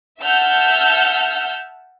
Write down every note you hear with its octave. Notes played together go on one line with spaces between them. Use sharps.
E5 F#5 A5 E6 F6 G6